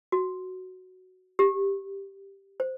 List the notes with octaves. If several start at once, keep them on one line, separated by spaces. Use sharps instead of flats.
F#4
G4
C5